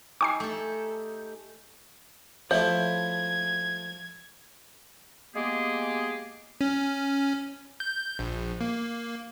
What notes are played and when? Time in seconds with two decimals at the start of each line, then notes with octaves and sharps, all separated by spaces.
0.21 D#4 G4 G#5 C#6 D6 C7
0.40 A3 A4
2.51 F3 A3 E4 C#5 G#6
5.35 G#3 A#3 B3 G4 G#4
6.61 C#4
7.80 G6
8.19 A#1
8.61 A#3